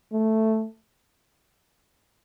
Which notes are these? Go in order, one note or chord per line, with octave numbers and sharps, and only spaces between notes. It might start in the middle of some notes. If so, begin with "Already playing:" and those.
A3